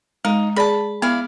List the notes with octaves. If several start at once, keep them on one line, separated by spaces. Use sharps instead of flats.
G#3 D#4
G#4 D5 A5 B5
B3 E4 D5 F5